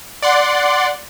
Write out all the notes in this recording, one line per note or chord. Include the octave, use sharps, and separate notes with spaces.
D5 F#5 C6